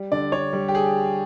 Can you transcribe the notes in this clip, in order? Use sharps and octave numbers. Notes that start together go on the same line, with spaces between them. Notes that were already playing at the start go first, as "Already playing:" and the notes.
Already playing: G3
D3 D5
D3 C#5
G3
G4
G#4